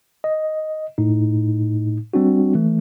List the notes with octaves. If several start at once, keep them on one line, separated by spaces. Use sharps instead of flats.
D#5
A2 D#4
G3 C4 D4 F#4
E3 A3